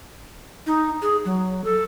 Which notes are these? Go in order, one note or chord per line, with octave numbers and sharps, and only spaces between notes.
D#4
G#4
F#3
A4